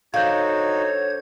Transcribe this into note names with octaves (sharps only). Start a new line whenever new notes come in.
D3 D#4 F#4 C5 C#5 F5 G6 G#6